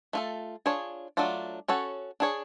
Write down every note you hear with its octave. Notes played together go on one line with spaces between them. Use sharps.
A3 F4 A4
D4 F4 G#4 C#5
F#3 A3 D4 F4
C#4 F#4 A4 C#5
D4 G#4 C#5